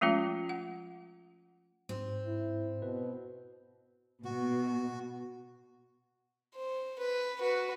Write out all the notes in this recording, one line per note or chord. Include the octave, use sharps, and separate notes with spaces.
F3 G#3 A3 C#4 F4
F#5
G#2 C4
E4
B2 B4
B2 F#4
C5
B4
F#4 B4